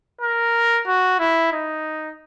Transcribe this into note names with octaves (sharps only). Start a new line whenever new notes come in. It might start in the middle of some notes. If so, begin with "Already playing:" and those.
A#4
F#4
E4
D#4